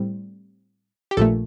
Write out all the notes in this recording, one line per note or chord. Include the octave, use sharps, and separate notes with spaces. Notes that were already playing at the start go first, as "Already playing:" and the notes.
Already playing: A2 G3 C4
G4
A#1 A#2 A3 A4